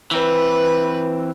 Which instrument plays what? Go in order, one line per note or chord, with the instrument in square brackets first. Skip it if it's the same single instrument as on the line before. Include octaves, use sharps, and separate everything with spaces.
[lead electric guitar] E3 C4 [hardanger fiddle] B4